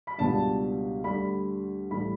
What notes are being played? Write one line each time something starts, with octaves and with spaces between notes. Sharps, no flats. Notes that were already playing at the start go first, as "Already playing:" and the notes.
B5
C#2 B2 G3 B3 D4 A5
D2 D3 G3 D4 B5
A1 A2 G3 B5